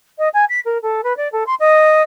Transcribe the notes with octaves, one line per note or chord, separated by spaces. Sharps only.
D#5
G#5
B6
A#4
A4
B4
D5
A4
C6
D#5